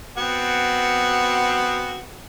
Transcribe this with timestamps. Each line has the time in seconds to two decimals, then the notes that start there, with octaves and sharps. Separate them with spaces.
0.17 B3 C4 F#4